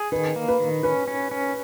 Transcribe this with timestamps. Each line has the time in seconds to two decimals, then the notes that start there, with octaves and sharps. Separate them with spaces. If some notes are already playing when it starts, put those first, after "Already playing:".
Already playing: G#4
0.12 D#3 B4
0.36 A#3
0.48 B4
0.60 D#3
0.83 C#4 B4
1.08 C#4
1.31 C#4